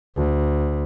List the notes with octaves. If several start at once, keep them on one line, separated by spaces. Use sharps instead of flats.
D2